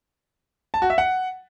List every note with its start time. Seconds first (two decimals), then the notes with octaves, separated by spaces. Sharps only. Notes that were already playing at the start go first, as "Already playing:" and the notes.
0.74 A5
0.82 F#4
0.90 E5
0.98 F#5